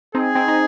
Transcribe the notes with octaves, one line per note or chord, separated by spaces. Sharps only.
C4 D#4 G#4
C4 D#4
D#4